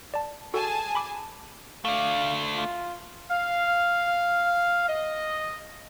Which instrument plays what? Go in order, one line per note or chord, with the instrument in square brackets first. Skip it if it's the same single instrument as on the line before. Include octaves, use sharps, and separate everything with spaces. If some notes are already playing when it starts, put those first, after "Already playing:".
[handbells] D5 A5
[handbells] F#4 A4 [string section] G#4 G#5 A5
[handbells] B5 D6
[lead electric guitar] A3 D4 [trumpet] F5
[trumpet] F4
[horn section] F5
D#5